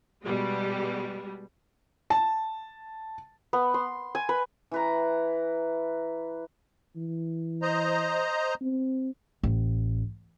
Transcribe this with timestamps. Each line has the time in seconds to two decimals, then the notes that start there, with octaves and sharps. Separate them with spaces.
0.24 B2 G3 G#3
2.10 A5
3.53 B3
3.74 C6
4.15 G#5
4.29 B4
4.71 E3 B4 A#5
6.96 E3
7.62 C5 D#5 A#5
8.62 C4
9.43 A1